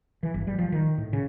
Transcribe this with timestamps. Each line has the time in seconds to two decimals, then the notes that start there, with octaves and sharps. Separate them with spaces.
0.23 E3
0.34 G1
0.47 G3
0.59 F3
0.72 D#3
0.98 A2
1.13 C#3